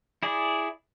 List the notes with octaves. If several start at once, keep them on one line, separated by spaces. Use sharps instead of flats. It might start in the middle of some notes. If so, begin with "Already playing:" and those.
E4 G#4 D5